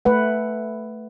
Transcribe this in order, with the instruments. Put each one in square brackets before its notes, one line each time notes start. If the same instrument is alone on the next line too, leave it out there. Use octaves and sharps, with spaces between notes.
[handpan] A3 B4 F#5